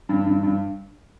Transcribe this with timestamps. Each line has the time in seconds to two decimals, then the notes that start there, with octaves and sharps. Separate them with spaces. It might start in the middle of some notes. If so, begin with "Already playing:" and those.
0.09 G2
0.26 G2
0.43 G2